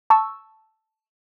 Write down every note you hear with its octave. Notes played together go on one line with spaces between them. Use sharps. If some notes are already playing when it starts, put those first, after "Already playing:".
A5 C#6 E6